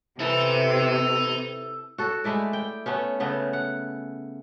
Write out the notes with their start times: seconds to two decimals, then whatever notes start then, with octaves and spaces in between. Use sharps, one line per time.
0.20 C3 D#4 E4 A4 B4
1.98 F#4 A4
2.24 G#3 A3 E4 D5
2.53 G5
2.86 A3 B3 C#4
3.20 C#3 A3 B3
3.53 F#5